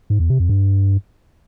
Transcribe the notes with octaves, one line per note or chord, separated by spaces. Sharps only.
G#2
E2
C3
F2
G2